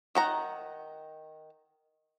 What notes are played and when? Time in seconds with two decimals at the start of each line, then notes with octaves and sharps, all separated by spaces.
0.15 D#3 F#5 A#5